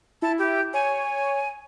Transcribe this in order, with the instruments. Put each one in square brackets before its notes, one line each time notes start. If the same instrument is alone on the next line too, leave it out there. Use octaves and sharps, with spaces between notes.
[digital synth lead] E4 [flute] A5
[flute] G4
[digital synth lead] C#5 [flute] G#5